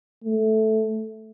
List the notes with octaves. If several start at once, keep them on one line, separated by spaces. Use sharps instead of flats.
A3